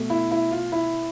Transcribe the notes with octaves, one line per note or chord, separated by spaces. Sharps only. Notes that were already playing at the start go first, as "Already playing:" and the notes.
Already playing: B2 A3
E4
E4
F4
E4